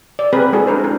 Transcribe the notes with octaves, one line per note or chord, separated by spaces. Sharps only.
D5
C4 G#4 A#4 B4
G#3 E4 F#4 G#4 A4
D4 A#4 C5
D4 A#4